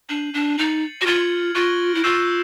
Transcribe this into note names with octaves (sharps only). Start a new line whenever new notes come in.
D4 G6 C7 D#7 F#7
D4
D#4 A6 C#7 F#7
F#4
F4 F6 G#6 C#7 F#7
F4 C#6 F#6 A#6 D7 G7
E4
F4 C#6 E6 G6 C7 E7